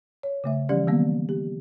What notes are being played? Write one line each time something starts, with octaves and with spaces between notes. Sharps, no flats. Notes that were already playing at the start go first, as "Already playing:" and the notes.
C#5
C#3 A3 E5
E3 F3 G3 C#4 G4 D5
D#3 F#3 G3 A#3 B3
G4